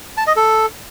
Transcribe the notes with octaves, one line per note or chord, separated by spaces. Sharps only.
A5
D#5
A4